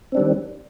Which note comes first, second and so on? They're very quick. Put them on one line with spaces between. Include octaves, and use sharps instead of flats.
C4 D4 G3 D#3